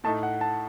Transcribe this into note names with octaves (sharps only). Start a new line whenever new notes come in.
A2 A3 D#4 A5
F#5
A5